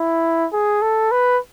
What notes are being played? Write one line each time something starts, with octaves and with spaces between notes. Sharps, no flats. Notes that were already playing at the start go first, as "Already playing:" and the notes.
Already playing: E4
G#4
A4
B4